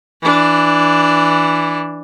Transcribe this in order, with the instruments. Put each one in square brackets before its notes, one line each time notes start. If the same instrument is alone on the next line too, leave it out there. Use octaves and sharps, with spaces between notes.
[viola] E3 D4